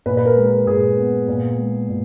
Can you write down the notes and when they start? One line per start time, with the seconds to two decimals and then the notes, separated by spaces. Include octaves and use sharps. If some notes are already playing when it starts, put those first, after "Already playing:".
0.06 A#2 B4
0.17 B4
0.25 A#4
0.36 G#3
0.46 A#4
0.67 A#2 G#4
0.97 B3
1.28 A#2
1.58 G#3
1.89 A#2